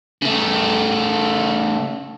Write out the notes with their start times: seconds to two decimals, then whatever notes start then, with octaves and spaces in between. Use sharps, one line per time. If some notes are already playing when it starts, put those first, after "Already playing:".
0.22 C#3 A3